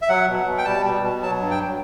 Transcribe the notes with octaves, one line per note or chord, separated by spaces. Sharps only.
E5
F#3 F#5
B2
B2
G5
G3 A5
B2
B2
F#3 A5
G2
G5